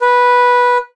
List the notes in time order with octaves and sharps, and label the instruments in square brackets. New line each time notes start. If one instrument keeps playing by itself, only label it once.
[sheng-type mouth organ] B4